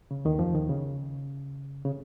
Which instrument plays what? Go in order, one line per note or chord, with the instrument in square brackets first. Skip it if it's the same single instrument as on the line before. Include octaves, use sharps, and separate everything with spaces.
[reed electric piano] C#3
D#2 D#3
F2 F3
D#2 D#3
C#3
C#3